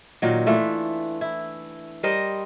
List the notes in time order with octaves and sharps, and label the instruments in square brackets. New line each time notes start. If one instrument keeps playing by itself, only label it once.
[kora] A#2 D#3 F#3
E3 A3 D4 F4
E4
G3 A#4 C5 D#5